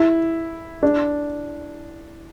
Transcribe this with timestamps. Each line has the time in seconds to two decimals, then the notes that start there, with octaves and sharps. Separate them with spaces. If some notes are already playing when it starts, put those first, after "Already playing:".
Already playing: E4
0.83 D4